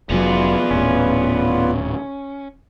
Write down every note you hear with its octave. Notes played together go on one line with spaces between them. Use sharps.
F1 F#3 B3 F4 G#4 B4 D5
D#1 A2 C#4